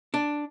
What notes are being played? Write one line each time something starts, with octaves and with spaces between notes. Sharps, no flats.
D4